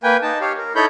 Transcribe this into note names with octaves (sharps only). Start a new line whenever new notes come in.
A#3 B4 G5 G#5
D#4 A5
G4 C#5 F5
A#4
D#4 E4 A4 C#5 B5 G6